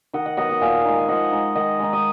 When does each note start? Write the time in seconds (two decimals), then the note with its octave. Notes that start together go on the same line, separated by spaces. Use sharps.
0.13 D#3 D#5 F#5
0.26 D#5 F#5
0.37 F#3 B3 D#5 F#5
0.49 D#5 F#5
0.61 A#2 F5 G#5
0.85 G#3 D#4
0.98 G#5
1.08 F3 D#5 F#5
1.32 G#3 D#4
1.55 D#3 D#5 F#5
1.79 G#3 D#4
1.93 D#5